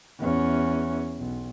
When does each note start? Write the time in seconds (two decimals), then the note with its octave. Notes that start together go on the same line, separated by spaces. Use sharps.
0.19 E2 C#4
1.18 B1